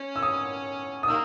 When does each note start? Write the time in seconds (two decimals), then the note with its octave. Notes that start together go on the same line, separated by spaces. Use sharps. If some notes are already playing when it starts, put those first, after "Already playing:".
Already playing: C#4
0.16 E6
0.23 D#6
1.03 D#6
1.08 D#3 A#3 E6